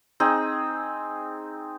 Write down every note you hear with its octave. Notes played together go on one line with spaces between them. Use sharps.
C4 D#4 G#4